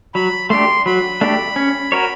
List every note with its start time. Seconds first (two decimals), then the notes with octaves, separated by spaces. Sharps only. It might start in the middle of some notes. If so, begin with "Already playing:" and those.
0.15 F#3 B5
0.50 A3 D4 G4 C6
0.86 F#3 B5
1.21 A3 D4 G4
1.56 C#4
1.92 F#4 A#4 C#5